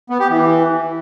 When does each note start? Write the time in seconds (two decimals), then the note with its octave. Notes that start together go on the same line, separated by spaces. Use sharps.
0.10 B3
0.20 G4
0.30 E3